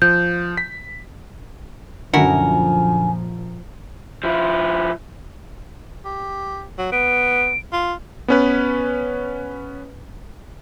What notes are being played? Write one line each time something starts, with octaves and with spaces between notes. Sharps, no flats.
F3 G6
B6
F#2 A#2 D3 F3 E4 F#4 A#4 G#5
F3 E4
G4
F#3
B3 D7
F4
B3 C#4 B4